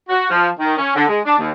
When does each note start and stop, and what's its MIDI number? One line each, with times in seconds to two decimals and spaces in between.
0.09 0.28 66
0.30 0.48 53
0.59 0.77 51
0.78 0.94 61
0.95 1.04 50
1.08 1.19 56
1.25 1.36 62
1.39 1.51 39